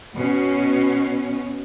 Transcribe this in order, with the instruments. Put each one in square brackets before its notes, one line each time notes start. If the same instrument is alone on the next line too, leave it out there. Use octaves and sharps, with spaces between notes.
[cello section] B2 C#4